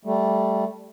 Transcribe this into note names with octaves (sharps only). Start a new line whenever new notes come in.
G3 A3